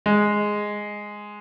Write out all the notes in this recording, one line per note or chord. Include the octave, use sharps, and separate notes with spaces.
G#3